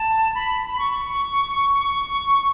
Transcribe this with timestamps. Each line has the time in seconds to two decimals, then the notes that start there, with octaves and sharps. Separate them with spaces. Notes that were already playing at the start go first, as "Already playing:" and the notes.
Already playing: A5
0.35 B5
0.67 B5
0.78 C#6